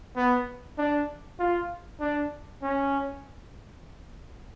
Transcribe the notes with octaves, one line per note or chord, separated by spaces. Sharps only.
B3
D4
F4
D4
C#4